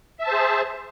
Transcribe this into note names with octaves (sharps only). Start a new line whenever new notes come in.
G#4 C5 E5 A5